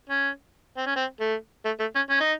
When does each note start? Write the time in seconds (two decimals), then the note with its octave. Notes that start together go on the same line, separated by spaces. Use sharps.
0.09 C#4
0.77 C4
0.86 C#4
0.96 C4
1.21 A3
1.65 A3
1.80 A3
1.96 C#4
2.10 C#4
2.20 D#4